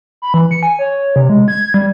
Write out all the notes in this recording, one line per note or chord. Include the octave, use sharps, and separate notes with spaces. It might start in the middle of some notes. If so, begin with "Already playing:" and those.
B5
E3
C#7
G#5
C#5
C3
G#3
G#6
G3